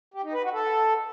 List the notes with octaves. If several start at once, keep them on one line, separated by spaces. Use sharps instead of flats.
G4
D#4
B4
F#4
A4